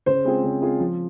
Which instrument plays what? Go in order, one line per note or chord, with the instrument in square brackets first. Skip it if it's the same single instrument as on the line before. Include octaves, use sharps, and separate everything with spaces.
[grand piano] C#3 [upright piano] C5
[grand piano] G#3 C4 F4 G#4
C#3
G#3 C4 F4 G#4
F3